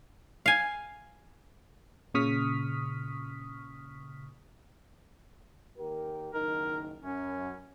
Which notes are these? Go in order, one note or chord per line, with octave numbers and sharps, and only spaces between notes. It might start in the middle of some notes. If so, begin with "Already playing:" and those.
F5 G#5
A#2 C#3 C#6 D#6 F6 B6
D#2 G4 A#4
F#1 D#3 D#4 A#4
F#2 C#4